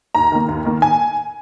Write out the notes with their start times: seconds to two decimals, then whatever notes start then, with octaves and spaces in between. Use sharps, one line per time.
0.15 D#2 A#5
0.32 D#3 A#3
0.48 D#2
0.65 D#3 A#3
0.82 G#5